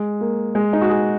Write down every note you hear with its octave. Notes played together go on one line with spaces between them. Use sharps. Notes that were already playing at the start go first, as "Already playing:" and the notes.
Already playing: G#3
A#3
G#3
D#4
F#4
G#4